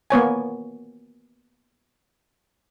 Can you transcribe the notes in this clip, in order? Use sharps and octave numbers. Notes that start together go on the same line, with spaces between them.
A#3 B3 C#5 G#5